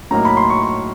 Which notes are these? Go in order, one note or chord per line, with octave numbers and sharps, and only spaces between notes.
A2 F#3 A#3 D#4 A#5
B5
C6
C#6
C#6